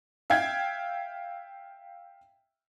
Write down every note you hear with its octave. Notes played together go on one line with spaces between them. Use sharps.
E5 F5 G5 G#6